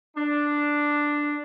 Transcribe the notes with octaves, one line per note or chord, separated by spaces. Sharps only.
D4